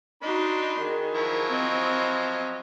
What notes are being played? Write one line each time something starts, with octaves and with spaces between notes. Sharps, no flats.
D4 D#4 F#4 B5 C6
D#3 G#4
F3 F#3 E4
C4 D#5